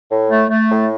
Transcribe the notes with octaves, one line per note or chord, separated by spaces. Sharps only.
A2
A3
A3
A2